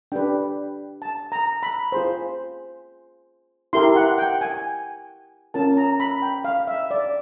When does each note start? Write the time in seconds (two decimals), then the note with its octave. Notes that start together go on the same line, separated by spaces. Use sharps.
0.12 D4 G4 B4 G5
1.02 A5
1.32 A#5
1.63 B5
1.92 F4 G#4 C5
3.73 E4 G4 A#4 C6
3.96 F#5
4.18 G5
4.41 G#5
5.54 C#4 F4 A#4 A5
5.77 A#5
6.00 B5
6.22 G5
6.44 F5
6.67 E5
6.91 D5